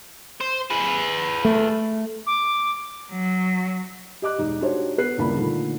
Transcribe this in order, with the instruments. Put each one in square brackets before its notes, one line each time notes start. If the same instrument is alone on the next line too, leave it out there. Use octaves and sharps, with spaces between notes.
[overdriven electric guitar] C5
G#4 B4
[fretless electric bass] A3
[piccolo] D6
[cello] F#3
[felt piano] G4 D#5 D6 F#6
E1 D#4
D4 D#4 F#4 G4 C5 C#5
B3 B4 F#6 C7
D#1 C#2 A#3 D4 E4 B5
A#2 D3 D#3 F3 A3